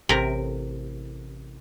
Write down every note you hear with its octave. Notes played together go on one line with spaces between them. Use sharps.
A1 C3 A#4